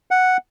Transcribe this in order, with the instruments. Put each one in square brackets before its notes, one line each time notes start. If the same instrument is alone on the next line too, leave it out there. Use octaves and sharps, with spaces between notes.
[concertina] F#5